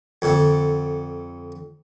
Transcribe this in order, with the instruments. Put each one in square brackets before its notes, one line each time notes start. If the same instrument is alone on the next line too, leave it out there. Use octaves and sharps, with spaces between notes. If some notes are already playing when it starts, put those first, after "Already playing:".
[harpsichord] F2 D3